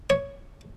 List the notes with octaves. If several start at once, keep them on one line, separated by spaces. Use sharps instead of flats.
C#5